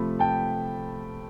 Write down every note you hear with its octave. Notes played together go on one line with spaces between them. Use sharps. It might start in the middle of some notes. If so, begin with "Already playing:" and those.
Already playing: C3 F3 A3 B5
G5 A5